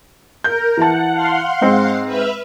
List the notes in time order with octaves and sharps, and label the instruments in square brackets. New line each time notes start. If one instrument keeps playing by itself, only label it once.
[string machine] A#4 [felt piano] G6
[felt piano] E3 A5 [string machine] F#5
[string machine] F5 F#5 C6
[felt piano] G#2 G#3 C4
[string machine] B4 E5 F6